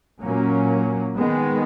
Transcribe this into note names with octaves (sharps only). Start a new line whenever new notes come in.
A#2 F#3 A#3 C#4
D#3 G#3 B3